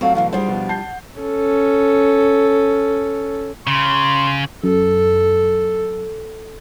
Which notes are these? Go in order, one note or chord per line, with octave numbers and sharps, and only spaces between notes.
F#3 A3 C4 F4 F5 C#6
B2 D3 E3 F5
G3 D4 F4 G#4 C5 F#5
B2 F3
A5 G6 C7
C#4 A4
C#3 C6
F#2 A4